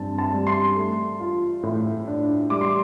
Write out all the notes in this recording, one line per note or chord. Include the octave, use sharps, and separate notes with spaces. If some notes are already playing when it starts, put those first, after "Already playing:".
Already playing: G2 C4 A5
A5
G3
C6
A3
F4
A2
D4
G3 D6
C6